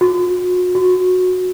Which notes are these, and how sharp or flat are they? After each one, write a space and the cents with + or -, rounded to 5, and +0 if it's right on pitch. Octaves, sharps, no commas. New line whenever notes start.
F#4 -40
F#4 -15